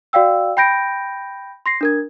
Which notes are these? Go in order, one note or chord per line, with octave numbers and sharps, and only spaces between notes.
F#4 D5 F5 G5 E6
G5 B5 G6 A#6 D7
C6 A#6 C7
D4 A#4 G#6